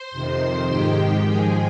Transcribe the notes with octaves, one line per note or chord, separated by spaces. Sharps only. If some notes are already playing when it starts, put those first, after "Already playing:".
Already playing: C5 C6
F2 C3 D#3
G#2 D#3 G#3 G4 G5
G#2 F3 G#3 G#4 G#5